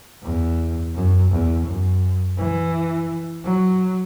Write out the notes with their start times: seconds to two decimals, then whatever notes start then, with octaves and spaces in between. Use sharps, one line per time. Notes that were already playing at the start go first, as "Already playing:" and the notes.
0.23 E2
0.95 F#2
1.31 E2
1.66 F#2
2.38 E3
3.45 F#3